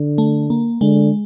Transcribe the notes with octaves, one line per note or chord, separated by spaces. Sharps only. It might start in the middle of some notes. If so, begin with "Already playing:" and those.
Already playing: D3
A3
A#3
D3 G#3